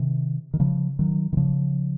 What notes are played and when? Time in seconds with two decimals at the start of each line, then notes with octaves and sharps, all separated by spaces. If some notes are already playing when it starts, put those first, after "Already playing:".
Already playing: C3 D#3
0.54 D#3
0.60 C#3 F3
0.99 D#3 F#3
1.33 D#3
1.37 C#3 F3